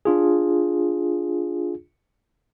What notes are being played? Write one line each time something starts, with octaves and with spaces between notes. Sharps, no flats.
D4 F4 G#4